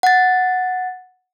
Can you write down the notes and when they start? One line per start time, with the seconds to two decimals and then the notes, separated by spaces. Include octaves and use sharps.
0.03 F#5 A6